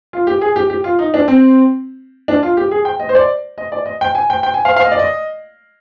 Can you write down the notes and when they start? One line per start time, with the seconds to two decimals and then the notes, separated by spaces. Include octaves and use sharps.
0.13 F4
0.27 G4
0.41 G#4
0.56 G4
0.70 G4
0.84 F4
0.99 D#4
1.14 D4
1.28 C4
2.28 D4
2.43 F4
2.57 G4
2.71 G#4
2.85 G5
3.00 D#5
3.09 C5
3.15 D5
3.58 D#5
3.72 D5
3.86 D#5
4.01 G5
4.15 G#5
4.30 G5
4.43 G5
4.54 G#5
4.65 F5
4.76 F5
4.84 D#5
4.92 D5
4.99 D#5